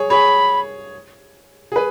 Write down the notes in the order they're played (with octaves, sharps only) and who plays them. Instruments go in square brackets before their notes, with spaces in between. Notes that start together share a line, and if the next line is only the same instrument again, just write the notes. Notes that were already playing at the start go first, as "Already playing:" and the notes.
Already playing: [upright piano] G#4 C#5
[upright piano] G#4 C#5 [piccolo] B5
[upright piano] G#4
B4